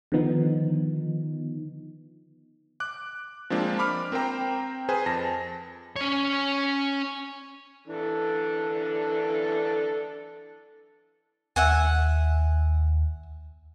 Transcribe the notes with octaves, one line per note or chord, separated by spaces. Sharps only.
D3 D#3 F3 B3 D#4
D6 F#6
F3 G#3 A#3 C4 D4 F4
B5 D6 F6
C4 A#4 C5 G5 A#5
G#4 B4 C5 G#5
F2 A5 A#6
C#4 C#5
E3 D4 A4
D#2 E5 F#5 G#5